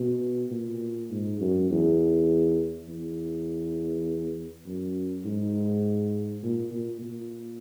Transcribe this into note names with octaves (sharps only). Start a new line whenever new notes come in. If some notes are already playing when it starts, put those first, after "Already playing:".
Already playing: B2
A#2
G#2
F#2
E2
E2
F#2
G#2
A#2
A#2
A#2